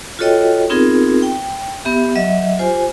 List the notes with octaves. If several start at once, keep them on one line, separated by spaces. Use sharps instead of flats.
F4 F#4 A4 C#5 D#5 G5
B3 C4 D#4 F4 G#4 A#4
G5
B3 G4 E5
F#3 D#5 E5
F4 G4 C5 G#5